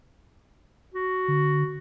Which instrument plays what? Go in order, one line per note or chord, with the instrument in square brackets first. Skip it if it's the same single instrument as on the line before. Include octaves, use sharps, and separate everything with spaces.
[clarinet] F#4
[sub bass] D3